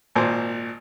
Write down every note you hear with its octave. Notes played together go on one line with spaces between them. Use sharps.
G#1 A#2 C5